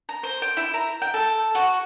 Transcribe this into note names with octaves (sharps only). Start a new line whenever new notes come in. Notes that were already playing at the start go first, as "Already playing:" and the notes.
A#5
C5
G5
E4
A#5
G5
A4
F#4